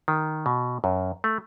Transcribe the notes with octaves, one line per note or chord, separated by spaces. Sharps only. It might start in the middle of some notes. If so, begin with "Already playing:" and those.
D#3
B2
F#2
A3